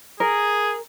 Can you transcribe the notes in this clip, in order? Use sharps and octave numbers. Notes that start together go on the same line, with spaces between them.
G#4 A#4